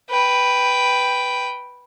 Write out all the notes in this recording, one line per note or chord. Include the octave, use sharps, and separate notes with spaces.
B4 G5